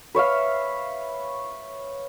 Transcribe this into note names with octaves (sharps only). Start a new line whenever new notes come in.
B4 C#5 E5 F5